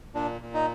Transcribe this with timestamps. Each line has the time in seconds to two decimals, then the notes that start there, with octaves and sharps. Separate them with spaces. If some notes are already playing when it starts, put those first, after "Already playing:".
0.14 A#2 D4
0.41 A#2
0.54 D#4